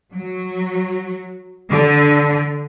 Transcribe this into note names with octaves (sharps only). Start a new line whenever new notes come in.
F#3
D3